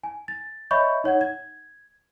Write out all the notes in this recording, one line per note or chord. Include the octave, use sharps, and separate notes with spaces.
G#5
A6
C#5 D#5 E5 B5 C#6 G6
D#4 C#5 F#5 G#6
G#6